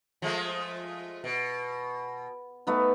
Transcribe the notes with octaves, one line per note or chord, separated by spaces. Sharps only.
F3 G#3 A3
B2
A3 B3 D#4